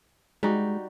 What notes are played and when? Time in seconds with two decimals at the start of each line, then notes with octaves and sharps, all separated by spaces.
0.43 G3 G#3 D#4 F#4